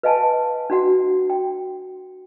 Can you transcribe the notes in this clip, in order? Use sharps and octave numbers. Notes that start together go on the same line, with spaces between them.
B4 D#5 F5 G#5 A5
D4 F#4 F#5
G5